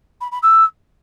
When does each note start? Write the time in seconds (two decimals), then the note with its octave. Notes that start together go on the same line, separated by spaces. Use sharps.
0.20 B5
0.31 B5
0.42 E6